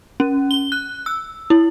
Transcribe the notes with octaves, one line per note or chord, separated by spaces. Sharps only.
C#4
G7
F#6
E6
E4